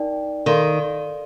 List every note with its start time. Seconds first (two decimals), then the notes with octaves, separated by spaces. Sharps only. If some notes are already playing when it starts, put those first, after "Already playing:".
Already playing: D#4 A#4 D5 G5
0.46 D#3 A4 D5 F5 C6